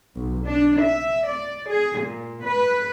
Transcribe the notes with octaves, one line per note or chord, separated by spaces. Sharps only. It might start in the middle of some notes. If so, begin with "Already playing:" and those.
B1
D4
E5
D5
G#4
A#2
B4